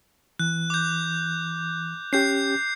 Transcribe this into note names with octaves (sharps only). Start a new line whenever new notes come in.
E3 F#6
D6 G6
C#4 G4 G6 C7